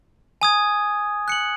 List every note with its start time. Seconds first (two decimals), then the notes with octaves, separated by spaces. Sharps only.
0.41 G#5 D#6 G#6
1.28 F#6 C#7 F#7